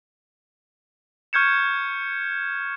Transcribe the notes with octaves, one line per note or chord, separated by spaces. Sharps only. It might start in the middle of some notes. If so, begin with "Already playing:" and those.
C#6 F6 G6 G#6 C#7 E7